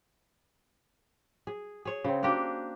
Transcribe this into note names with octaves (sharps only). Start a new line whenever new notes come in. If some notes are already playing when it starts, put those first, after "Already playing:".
G#4
G#4 C#5
C#3 C4
A#3 D4 F#4 G4